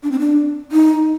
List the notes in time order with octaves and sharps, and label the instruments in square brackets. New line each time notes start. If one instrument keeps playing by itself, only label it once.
[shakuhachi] D4
C4
D4
D#4